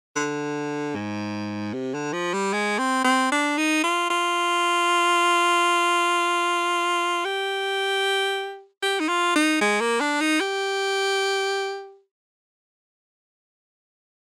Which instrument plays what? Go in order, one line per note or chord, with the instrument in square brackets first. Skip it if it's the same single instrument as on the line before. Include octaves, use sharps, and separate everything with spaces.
[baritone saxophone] D3
G#2
C3
D3
F3
G3
G#3
C4
C4
D4
D#4
F4
F4
G4
G4
D#4
F4
D#4
G#3
A#3
D4
D#4
G4